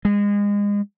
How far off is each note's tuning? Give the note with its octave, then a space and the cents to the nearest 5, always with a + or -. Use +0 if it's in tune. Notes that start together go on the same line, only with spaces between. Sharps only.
G#3 -30